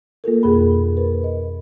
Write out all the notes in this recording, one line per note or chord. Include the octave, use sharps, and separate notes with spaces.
A#3 F4 A4 A#4
F2 B2 G#4 B5
A#4 B4
D#5